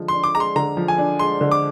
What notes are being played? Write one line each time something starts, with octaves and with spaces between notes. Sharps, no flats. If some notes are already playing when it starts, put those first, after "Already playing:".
Already playing: D3 F3 G#3
D4 C6
D6
G#3 A#5
C6
D3 A#5
F3
G#5
D4
G#3 C6
D3
D6